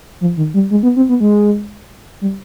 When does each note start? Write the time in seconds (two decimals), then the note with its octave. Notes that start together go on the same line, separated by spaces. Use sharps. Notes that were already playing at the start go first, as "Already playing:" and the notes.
0.21 F3
0.37 D#3
0.54 G3
0.71 G#3
0.83 B3
0.96 C4
1.09 B3
1.20 G#3
2.21 G3